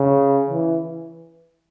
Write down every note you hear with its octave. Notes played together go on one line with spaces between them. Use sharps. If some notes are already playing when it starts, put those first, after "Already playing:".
Already playing: C#3
E3